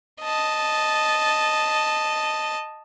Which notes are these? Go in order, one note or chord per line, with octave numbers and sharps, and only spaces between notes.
D#5 A5